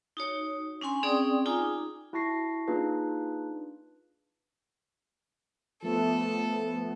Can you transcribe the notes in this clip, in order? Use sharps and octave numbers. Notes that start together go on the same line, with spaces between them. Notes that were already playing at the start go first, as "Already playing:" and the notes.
D#4 F#4 C#5
C#4 D4 G#5 C6
C4 C#4 G#4 D5 G5 D#6
D#4 F4 G#4 G#5 A#5 D6
E4 F#4 A5 C#6 A#6 C7
A#3 D4 D#4 F4 G#4 B4
F3 A3 B3 A4